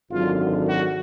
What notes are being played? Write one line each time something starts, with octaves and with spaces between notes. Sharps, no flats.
G#1 F#2 D3 F#3 F4
F#4